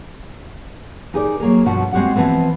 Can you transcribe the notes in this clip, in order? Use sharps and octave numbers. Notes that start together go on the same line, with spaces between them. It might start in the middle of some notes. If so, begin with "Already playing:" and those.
D#4 G4 G#4 A#4 C#5 D5
F#3 A#3 G#4 A#4
G2 B2 F3 F#4
G#3 C4 F#4 G4 F#5
E3 F3 B3 C4